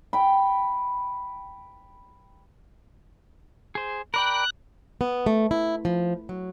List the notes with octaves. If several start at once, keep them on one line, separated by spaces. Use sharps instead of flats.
G5 B5
G#4 C5
A#4 D5 G5 B5 F#6
B3
A3
E4
F3
F#3